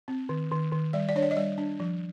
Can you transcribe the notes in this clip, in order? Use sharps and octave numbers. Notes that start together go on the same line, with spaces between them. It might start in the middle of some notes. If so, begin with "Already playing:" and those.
C4
D#3
D#3
D#3
G3 D5
D5
D4 C#5
D5
D#5
G3 D5
D4
F3